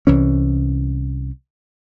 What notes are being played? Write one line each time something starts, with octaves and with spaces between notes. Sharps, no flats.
C2 E3 C#4